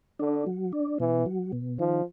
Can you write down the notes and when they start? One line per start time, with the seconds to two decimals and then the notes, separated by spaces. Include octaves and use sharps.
0.19 D3 D4
0.46 F#3
0.73 D4
1.00 B2 E3
1.26 F#3
1.52 B2
1.79 D#3 F3